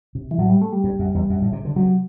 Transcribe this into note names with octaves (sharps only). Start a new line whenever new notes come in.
C3
E3
A2 F#3
G3
A3
G3
G2
F#2
E2
F#2
A2
C3
D3
C3 F#3